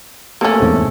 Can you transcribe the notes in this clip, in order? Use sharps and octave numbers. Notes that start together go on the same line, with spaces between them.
A3 A#3 C#4 A4
E2 G#2 C3